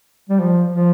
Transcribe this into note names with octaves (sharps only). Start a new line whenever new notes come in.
G3
F3
F3